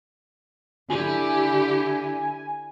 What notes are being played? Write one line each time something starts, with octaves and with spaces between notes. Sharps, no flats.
D3 E4 G4 G#5